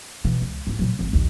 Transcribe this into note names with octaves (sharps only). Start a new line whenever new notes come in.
B2 E3
C#2
G#2 F4
A#2 F#3
D1 G#1
A#1 D#2